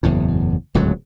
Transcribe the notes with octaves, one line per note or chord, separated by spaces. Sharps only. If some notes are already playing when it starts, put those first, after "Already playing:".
F#1 E2 A2
D1 C#2 G#2 F#3